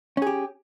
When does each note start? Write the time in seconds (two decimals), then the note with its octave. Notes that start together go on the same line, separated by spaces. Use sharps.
0.17 C#4
0.22 G#4
0.27 G4